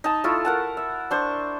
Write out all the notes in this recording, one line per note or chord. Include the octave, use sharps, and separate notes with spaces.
D#4 A5
A3 E4 F4 A4
A#4 F#5 A5
E5
D4 C5 C#6